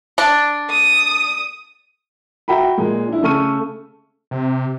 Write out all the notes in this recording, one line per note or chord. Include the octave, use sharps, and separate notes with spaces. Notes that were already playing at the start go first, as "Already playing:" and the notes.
D4
D#6
F#4 E5 G5 A#5 B5
A#2 G#3
D4 E4
C#3 A3 A4 C#6 F6 D#7
C3